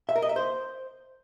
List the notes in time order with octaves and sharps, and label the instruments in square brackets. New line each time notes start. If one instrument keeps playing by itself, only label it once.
[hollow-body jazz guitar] E5
A#4
D#5
E5
C5